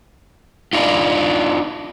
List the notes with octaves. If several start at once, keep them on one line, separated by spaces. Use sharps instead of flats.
D4 D#4 F4